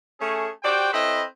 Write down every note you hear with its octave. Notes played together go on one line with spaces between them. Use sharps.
A3 C#4 G#4
F#4 G4 C5 D5 G5
C4 E4 A4 B4 C#5 D#5